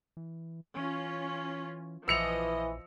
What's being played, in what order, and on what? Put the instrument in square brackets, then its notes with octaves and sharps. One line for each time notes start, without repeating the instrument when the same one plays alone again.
[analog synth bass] E3
[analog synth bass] E3 [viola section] C#4 F4
[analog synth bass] A#1 [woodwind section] E3 [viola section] F3 D#5 [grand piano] E6 C#7 F7